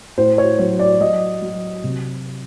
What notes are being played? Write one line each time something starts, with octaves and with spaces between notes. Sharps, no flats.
A2 C5
C#5
F#3 C#5
D5
F#3 D#5
F#3
C3